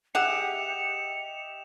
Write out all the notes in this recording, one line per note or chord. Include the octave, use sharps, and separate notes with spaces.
G4 G#4 D#5 E5 F#5 C#7 E7 F7